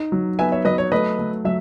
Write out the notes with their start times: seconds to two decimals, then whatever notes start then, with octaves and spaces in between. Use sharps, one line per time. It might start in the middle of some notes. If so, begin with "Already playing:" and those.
Already playing: D#4
0.12 F#3
0.39 B3 E5 G#5
0.52 C#5 E5
0.65 F#3 B4 D#5
0.78 C#5
0.92 A3 B4 D#5
1.19 A3
1.45 F#3 E5